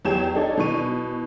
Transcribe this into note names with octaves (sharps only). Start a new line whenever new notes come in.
E2 F#3 G4 C#5 G5 E7
D4 D#4 A4 C#5 D5
B2 D#3 E3 C#6 D#7